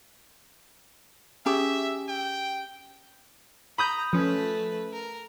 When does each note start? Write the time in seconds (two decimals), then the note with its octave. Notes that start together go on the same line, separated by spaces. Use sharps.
1.46 C#4 G4 G#4 E5
2.08 G5
3.78 A#5 B5 D#6 G6
4.13 F3 A3 C#4 B4
4.93 A#4